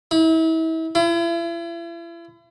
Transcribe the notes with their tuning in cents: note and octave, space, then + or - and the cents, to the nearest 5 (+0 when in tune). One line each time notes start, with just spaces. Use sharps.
E4 -35
E4 +40